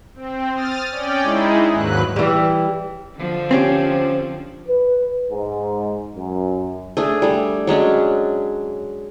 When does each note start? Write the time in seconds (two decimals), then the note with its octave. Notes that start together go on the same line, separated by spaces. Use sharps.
0.15 C4
0.54 D#6 F6 A6
0.90 C#4 D5 G5
1.22 G#3 D#4 E4 G#4
1.70 D#2 G#2 F#3 B4 F#6
2.16 E3 G3
3.16 D3 F3
3.51 C4 C#4 G4
4.68 B4
5.31 G#2
6.16 F#2
6.97 A3 D4 G#4
7.22 G3 A3
7.67 F#3 G#3 C#4 D4